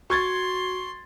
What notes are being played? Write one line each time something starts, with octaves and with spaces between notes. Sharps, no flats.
F#4 C6 C#6 G#6 A6